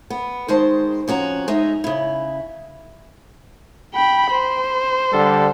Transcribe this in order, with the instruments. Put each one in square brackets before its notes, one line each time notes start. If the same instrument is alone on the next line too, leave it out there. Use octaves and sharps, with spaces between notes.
[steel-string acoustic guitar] B3
D#3 G#3 C5 A5
F2 C#4 F#4 A#5
G#3 D#4 D#5 E5
C#3 E4
[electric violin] G5 B5
C5
[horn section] D3 G3 A4